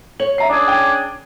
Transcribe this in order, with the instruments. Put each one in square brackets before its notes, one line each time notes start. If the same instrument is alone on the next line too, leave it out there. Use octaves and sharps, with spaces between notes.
[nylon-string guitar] C#5 [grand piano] F#7
[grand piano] E5 A#5 C7
[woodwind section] C#4 D4 G#4 [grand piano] D5
[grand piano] G5